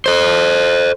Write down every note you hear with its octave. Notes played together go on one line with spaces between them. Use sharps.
A4 C5